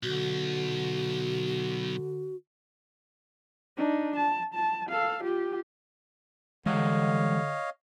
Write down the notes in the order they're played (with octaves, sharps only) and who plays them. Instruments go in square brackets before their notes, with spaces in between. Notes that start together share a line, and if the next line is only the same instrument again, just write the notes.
[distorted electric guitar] B1 [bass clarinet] D3 [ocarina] F#4
[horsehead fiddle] D4 D#4
A5
A5
A4 F5
F4 G4
[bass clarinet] D3 [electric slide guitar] E3 G3 F#5 [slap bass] G#3 [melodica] C#5 D#5 F5